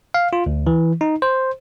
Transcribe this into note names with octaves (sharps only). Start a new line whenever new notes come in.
F5
F4
D2
E3
D#4
C5